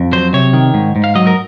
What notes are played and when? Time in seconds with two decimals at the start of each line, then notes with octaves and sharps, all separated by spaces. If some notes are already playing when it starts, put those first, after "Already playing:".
Already playing: F2
0.13 F#3 C5
0.33 C3 C#5
0.53 D#3
0.74 G#2
0.96 G#2
1.04 F5
1.15 F#3 D#5
1.27 A#4